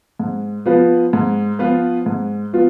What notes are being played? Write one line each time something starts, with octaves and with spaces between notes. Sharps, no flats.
G#2
F3 B3 F4 B4
G#2
F3 B3 F4 B4
G#2
F3 B3 F4